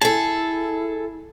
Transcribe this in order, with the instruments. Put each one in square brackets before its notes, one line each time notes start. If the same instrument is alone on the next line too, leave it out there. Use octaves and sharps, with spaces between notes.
[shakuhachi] E4 [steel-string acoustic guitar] G#4 A4 [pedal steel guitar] A5